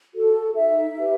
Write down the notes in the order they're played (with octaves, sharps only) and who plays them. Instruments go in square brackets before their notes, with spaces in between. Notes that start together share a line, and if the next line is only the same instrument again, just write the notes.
[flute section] F#4 A4
D#4 E5
G4 B4